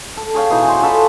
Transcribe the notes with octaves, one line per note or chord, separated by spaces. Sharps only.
A4
G#4 C#5 F5 G5
B2 E3 D#4 G#4
D#4 C5
F4 F#4 A4 B4